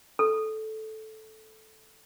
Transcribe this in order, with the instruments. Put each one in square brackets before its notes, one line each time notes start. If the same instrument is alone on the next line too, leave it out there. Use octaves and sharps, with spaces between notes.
[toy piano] A4